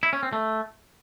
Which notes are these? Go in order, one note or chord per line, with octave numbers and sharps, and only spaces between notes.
E4
C#4
C4
A3